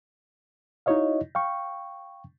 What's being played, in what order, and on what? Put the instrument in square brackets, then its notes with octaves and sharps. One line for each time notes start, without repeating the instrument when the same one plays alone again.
[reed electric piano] D#4 E4 F#4 C#5 D#5 F5
F5 G5 C#6